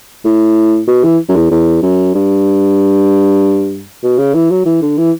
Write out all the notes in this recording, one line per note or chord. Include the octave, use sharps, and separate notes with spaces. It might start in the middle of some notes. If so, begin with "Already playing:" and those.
A2
B2
E3
F#2
E2
E2
F#2
G2
B2
C#3
E3
F#3
E3
D3
E3